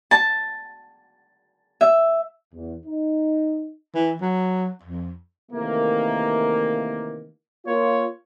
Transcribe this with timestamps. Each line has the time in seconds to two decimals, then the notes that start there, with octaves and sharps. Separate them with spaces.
0.11 A5
1.81 E5
2.54 E2
2.85 D#4
3.95 E3
4.21 F#3
4.83 F2
5.51 C3 D#3 E3 A3 A#3
7.65 A#3 F4 C#5